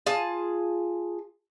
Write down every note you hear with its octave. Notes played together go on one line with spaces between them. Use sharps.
F4 G#4 A5